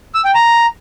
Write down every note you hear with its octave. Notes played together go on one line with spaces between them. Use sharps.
E6
G5
A#5